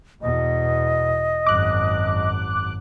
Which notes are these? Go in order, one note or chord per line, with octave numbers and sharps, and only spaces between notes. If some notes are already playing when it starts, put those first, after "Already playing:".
E2 B2 D#5
G#1 F#2 D6 F#6